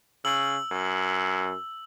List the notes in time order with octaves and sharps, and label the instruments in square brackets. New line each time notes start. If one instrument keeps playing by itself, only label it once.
[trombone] C#3 [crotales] E6 F#7
[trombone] F#2